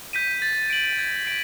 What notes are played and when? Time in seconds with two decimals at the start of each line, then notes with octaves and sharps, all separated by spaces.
0.13 G6 B6 D#7
0.42 A6
0.70 D7 F#7
0.98 G#6
1.26 B6 D7